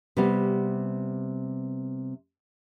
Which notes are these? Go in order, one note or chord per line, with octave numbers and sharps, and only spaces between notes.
C3 G3 B3